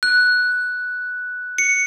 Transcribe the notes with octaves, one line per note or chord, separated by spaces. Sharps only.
F#6
C#7